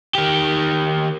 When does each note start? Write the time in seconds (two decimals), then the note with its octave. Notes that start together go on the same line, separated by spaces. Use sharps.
0.15 D#3 G4